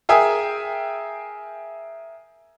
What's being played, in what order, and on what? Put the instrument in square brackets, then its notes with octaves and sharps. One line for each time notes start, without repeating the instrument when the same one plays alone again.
[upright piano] G#4 A#4 E5 G5 G#5 D#6